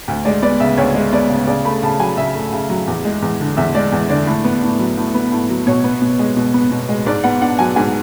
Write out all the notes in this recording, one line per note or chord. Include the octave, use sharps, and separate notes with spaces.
D2
G#3 D5
B3 D5
C#3 E5
D2 C#5
G#3
B3 D5
C#3
C#3 D5
A3 B5
C#3 A5
F#3 G#5
C#3 E5
A3
C#3
F#3
E2
G#3
E2
D3
E2 E5
G#3 D5
E2
D3 D5
A2
B3
A2
F#3
A2
B3
A2
F#3
B2 C#5
B3
B2
G#3
B2
B3
B2
G#3
G#2 D5
B3 F#5
D4 F#5
F#3 G#5
G#2 G#5